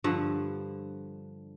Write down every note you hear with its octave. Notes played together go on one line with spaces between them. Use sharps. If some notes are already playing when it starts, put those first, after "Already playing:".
G2 D3 F3 F#5